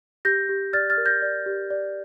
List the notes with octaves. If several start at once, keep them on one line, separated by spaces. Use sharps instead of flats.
G4 G6 A#6
G4
D5 F6 A6
F6 A6
A#4
G6 A#6
D5
G4
D5